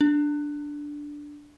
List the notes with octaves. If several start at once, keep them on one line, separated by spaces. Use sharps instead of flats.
D4